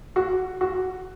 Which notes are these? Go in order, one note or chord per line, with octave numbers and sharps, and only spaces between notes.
F#4
F#4